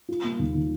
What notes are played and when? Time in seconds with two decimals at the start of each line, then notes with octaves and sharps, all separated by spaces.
0.09 F4
0.24 A#3
0.39 D#2
0.54 D#3